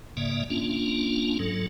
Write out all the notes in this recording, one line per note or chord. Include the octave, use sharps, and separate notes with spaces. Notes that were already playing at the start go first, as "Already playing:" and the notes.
G#2 C#3 A#3 D5 E5
A#3 C#4 D4 F4
G#2 F#3 A4